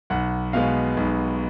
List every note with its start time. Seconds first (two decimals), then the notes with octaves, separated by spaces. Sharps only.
0.10 B1 F#5
0.53 B2 G#3 B3 F5
0.97 B1